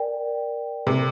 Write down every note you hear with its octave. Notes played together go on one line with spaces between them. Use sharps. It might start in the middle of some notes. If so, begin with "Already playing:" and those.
Already playing: A#4 D5 G5
C3